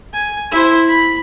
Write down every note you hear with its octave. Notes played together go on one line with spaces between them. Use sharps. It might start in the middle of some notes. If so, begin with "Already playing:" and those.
G#5
E4 C5
B5